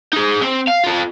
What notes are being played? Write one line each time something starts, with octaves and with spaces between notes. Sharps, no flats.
D#4 G#4
C4
F5
F4 A4